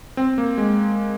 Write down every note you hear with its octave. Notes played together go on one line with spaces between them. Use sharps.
C4
A#3
G#3